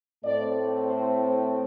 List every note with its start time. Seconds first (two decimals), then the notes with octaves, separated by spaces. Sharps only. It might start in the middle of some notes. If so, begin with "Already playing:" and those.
0.24 A2 A3 C4 D5
0.85 C5